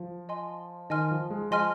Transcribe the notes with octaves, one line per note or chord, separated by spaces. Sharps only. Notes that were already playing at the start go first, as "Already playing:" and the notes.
Already playing: F3
D#5 G#5 C6
D#3 D#5 G#5 C6 F6
F3
G#3
F3 D#5 G#5 C6 F6